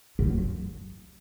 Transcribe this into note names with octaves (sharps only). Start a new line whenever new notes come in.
F#2